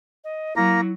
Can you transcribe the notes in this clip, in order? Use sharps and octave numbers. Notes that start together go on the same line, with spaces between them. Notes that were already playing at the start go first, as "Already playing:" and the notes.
D#5
F#3 A#3 E4 A#5